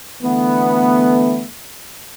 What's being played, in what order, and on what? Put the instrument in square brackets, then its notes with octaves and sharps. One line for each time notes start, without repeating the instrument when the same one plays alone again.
[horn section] D3 E3 A3 B3